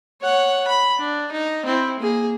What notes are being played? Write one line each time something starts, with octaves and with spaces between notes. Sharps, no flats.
C#5 F#5
B5
D4
D#4
C4 E4
A#3 G#4